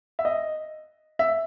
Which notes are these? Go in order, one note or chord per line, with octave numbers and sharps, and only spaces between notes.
E5
D#5
E5